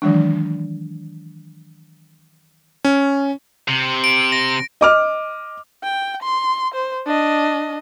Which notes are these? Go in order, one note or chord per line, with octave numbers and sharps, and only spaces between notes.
D#3 E3 F#3 G#3 D4
C#4
C3
D7
A#6
D#5 D6 F6
G5
C6
C5
D4 D#5